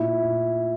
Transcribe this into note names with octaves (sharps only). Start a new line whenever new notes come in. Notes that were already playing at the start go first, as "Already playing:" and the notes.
Already playing: A#2 E4
A#2